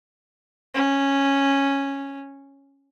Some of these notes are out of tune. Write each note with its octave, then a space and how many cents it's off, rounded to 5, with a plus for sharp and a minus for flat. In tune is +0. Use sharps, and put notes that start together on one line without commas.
C#4 -5